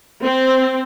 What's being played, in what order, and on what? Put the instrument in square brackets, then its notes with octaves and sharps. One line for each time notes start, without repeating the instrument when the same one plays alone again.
[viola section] C4